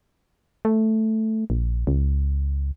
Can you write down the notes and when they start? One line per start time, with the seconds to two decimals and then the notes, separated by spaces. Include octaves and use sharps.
0.65 A3
1.50 A#1
1.87 C#2